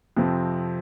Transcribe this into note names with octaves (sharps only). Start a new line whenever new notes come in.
F2 C3 F3 C4